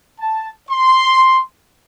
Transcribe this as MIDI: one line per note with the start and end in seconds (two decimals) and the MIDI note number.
0.20 0.51 81
0.70 1.40 84